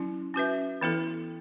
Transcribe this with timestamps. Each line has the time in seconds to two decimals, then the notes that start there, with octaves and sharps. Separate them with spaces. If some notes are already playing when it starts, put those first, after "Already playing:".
Already playing: F#3 C#4 E4
0.34 C#4 F#4 B4 E5
0.81 E3 B3 E4 A4